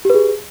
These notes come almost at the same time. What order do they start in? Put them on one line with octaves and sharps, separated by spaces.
G4 B4 G#4